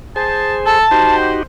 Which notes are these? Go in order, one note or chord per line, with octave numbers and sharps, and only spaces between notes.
G#4 C5 A5
A4 A5
D#4 F#4 G4 C5